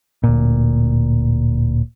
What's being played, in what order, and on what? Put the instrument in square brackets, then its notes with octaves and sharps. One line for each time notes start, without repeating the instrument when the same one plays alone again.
[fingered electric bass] D1 A#2